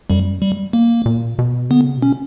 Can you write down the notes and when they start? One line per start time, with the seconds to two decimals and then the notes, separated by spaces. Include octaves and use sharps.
0.10 F#2 G3
0.42 G3
0.73 A#3
1.06 A#2
1.39 B2
1.70 D3 B3
1.84 C#3
1.98 B2 C#4